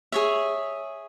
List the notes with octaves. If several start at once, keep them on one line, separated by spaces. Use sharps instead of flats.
G#4 C#5 E5